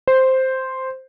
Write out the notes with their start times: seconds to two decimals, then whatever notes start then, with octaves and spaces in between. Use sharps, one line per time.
0.07 C5